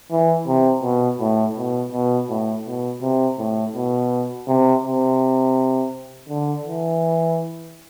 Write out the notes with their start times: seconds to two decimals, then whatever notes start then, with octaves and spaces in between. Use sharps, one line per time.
0.11 E3
0.47 C3
0.83 B2
1.20 A2
1.57 B2
1.92 B2
2.29 A2
2.66 B2
3.02 C3
3.39 A2
3.74 B2
4.47 C3
4.84 C3
6.29 D3
6.65 E3